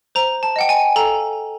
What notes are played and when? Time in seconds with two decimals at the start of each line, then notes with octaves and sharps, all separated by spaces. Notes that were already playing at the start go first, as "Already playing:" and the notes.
0.15 C5 A#5
0.43 A5
0.56 D#5 F#5 G5
0.69 G#5
0.96 A4 A#5